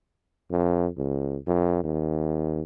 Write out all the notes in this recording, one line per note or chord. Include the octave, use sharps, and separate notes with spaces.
F2
C#2
F2
D#2